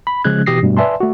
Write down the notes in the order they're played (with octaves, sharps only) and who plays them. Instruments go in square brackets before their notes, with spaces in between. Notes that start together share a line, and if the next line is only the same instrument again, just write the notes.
[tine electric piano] B5
C#3 F3 G#3 C#4 F#6 G#6
B2 E3 G4 D#6 A#6 C7
G2 B2 G3 A3
B4 D5 E5 G#5 A5 C6
A3 F#4